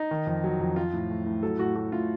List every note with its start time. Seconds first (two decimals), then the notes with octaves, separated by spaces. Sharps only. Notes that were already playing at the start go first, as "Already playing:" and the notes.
Already playing: D#4
0.11 D#3
0.27 F2
0.44 F#3
0.60 F2
0.76 F3 F4
0.93 A2
1.10 A3
1.26 A2
1.43 F#3 A4
1.59 A2 F#4
1.75 A3 F#4
1.92 A2 F4